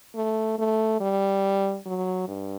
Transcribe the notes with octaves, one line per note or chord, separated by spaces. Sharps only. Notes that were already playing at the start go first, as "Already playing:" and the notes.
A3
A3
G3
F#3
G2